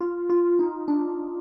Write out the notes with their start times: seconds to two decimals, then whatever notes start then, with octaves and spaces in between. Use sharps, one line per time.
0.01 F4
0.30 F4
0.59 D#4
0.88 D4